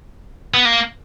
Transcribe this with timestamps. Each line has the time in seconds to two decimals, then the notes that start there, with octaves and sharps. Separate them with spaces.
0.54 B3
0.65 A#3